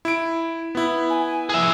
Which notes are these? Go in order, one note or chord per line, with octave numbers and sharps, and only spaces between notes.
E4 D7
B3 E4
G#5
G#4 E5